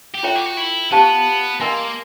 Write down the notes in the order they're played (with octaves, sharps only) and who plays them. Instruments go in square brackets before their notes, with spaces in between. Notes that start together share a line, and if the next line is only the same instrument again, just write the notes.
[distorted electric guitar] G4
[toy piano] F4 A4 C#5 E5 G5 [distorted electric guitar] F#4
[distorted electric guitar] G4
F#4
E4
[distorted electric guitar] B3 [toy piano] G4 C5 F5 A5 C#6
[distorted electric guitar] A#3 [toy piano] A#4 D#5 G#5 C6